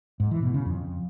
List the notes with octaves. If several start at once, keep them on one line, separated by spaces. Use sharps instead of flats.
G#2
E3
B2
C#3
F2